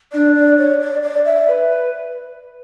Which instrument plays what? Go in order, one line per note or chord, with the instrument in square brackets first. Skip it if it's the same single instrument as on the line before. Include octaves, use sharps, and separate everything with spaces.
[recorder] D4 [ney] D5
[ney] D5
C#5
D5
D5
E5
[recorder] B4